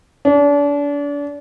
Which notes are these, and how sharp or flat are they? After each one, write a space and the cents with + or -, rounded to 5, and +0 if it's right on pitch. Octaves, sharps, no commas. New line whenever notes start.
D4 -35